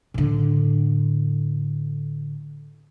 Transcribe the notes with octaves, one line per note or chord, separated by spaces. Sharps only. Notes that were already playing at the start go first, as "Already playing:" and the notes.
A2 D3